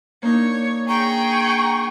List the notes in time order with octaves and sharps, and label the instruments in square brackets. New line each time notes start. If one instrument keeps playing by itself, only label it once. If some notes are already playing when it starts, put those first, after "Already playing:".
[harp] A#3 D4 D#4 [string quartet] C#5
[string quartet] G#4 G5 [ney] A#5 [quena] C#6